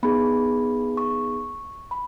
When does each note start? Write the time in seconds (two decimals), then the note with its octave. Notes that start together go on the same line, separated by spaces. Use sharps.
0.03 B3 D#4 G#4 B5
0.97 C#6
1.91 B5